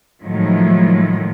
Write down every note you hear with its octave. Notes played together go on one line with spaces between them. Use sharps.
A2 D#3 F3 F#3 G#3